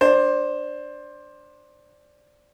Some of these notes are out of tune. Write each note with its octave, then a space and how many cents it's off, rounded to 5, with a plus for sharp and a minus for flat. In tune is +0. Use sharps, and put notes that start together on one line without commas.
D4 +0 C5 +15